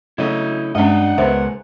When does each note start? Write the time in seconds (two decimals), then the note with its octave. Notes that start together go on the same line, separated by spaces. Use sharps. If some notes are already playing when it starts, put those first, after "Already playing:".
0.18 C#3 F#3 A3 E4 D#5
0.75 G2 G#3 C#4 D4 D#5 F#5
1.18 C#2 G#3 B3 A#4 C5 E5